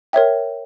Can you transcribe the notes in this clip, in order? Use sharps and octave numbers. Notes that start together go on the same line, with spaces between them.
A#4 C#5 E5 G5